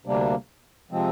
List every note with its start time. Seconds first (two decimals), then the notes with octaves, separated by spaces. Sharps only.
0.06 D2 C3 G3 A#3 D4
0.91 C3 F3 G#3 C4